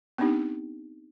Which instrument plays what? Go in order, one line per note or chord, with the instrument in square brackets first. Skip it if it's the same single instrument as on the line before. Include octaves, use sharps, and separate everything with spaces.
[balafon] B3 C4 D4 D#4 G4